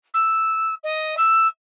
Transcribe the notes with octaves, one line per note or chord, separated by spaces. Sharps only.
E6
D#5
E6